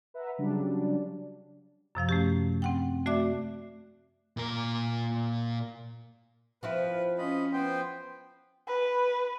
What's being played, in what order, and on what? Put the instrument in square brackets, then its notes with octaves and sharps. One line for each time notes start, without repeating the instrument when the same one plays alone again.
[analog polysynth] B4 E5 F#5 A#5
C#3 F#3 G3 D4
[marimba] F#2 C3 F3 F5
A3 C#4 G4
C4 F#5 G5
A3 F#4 D5 E5 D6 F#6
[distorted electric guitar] A#2 A#4
[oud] F3 C4 E4 [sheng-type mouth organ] B4
[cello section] C#4 [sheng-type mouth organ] F4 D#5 B5
[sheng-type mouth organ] B3 C5 G5
[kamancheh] B4